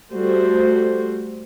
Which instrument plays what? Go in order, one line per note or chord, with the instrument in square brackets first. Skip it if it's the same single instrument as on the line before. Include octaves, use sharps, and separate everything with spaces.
[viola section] G3 A3 F#4 C5